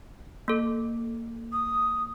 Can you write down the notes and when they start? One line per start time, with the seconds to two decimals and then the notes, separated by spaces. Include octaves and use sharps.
0.48 A#3 A4
1.52 D#6